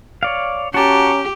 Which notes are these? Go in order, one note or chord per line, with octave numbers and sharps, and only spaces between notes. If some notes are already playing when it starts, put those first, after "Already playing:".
C#5 D5 F5
C#4 F#4 G4 A5 A#5